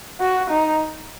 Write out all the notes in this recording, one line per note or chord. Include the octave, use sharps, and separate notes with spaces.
F#4
D#4